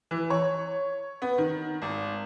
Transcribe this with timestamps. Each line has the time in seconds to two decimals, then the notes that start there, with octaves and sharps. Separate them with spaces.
0.11 E3
0.30 C#5
1.22 B3
1.38 D#3
1.82 G#1